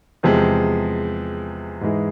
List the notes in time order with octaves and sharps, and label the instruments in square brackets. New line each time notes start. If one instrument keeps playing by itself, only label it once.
[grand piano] E2 C3 F3 G#3
G#2 E3 G#3